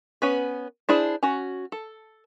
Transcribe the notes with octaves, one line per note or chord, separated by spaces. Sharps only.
B3 C#4 B4
D4 E4 G#4 C5
C#4 F#4
A4